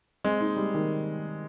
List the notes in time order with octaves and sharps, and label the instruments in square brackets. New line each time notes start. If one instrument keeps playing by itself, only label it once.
[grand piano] G#3 [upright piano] C4
[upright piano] D#4
G3
D#3